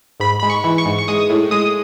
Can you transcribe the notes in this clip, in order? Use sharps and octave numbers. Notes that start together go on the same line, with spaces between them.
G#2 B5
G#3 B5
C#6
E3
C#6
G#2
C#6
G#3 D#6
A2
G#3 D#6